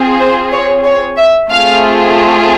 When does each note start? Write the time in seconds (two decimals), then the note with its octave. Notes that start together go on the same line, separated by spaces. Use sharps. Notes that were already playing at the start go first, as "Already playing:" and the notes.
Already playing: C4 F4 G#4
0.19 C5
0.52 C#5
0.84 C#5
1.17 E5
1.49 A3 C4 F4 G#4 F5